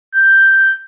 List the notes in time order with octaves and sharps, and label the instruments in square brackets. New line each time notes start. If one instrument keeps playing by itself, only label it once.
[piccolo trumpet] G6